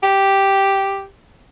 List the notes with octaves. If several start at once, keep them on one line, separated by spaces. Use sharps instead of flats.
G4